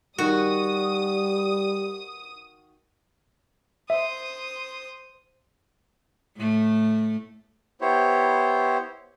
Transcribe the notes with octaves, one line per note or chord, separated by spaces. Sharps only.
D#3 G3 F#4 D#6
C5 E5 D#6
A2 A3
B3 E4 G4 C5 C#5